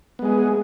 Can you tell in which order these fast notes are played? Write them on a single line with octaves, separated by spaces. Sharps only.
B3 G#3 G#4